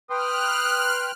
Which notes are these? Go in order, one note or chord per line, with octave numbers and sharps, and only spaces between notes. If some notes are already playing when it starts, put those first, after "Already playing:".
B4 G5 C6 D#6 F6 F#6